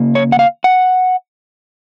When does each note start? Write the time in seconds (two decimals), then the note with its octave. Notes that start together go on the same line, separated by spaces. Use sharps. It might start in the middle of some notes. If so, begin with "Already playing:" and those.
Already playing: C#3 A#3
0.15 C#5
0.32 F#5
0.39 F5
0.64 F#5